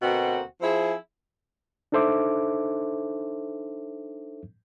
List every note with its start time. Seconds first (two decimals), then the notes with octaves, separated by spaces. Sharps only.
0.02 D2 B2 A#3 C4 F#4
0.62 F3 C4 E4 G#4
1.92 D4 D#4 A4 C5 E5 D6